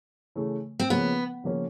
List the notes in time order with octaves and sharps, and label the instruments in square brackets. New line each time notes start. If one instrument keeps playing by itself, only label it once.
[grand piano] C#3 E3 A3
[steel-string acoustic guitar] C4
[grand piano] C#3 F3 A#3 C#4 [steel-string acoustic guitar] B3
[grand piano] C#3 F3 A#3 C#4